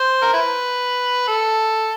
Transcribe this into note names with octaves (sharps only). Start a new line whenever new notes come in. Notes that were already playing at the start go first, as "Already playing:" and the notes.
Already playing: C5
A#4
E4 B4
A4